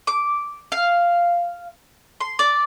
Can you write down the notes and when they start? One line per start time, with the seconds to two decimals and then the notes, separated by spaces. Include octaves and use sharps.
0.07 D6
0.72 F5
2.21 C6
2.39 D5